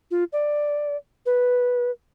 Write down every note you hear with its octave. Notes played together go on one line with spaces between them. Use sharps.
F4
D5
B4